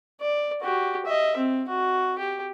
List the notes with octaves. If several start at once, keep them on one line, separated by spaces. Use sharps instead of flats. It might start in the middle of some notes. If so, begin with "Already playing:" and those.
D5
F#4 G4
D#5 E5
C4
F#4
G4